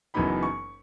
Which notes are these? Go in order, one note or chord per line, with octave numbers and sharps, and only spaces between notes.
F#1 F#2 E3 B3 D#4 B5
C#6